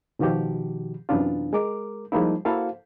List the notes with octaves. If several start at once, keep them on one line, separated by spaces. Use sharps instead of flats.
B2 D#3 F3 F#4 G4
F#2 C3 E3 B3 D4 F4
G#3 A#4 D6
F3 G3 G#3 A#3 D#4 E4
A#3 E4 F#4 A4 C5 F5